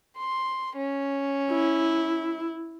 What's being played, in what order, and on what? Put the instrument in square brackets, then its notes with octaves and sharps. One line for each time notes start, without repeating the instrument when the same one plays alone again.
[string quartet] C6
C#4
[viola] E4